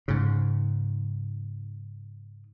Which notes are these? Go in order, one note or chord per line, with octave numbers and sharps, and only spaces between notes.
G#2 C#3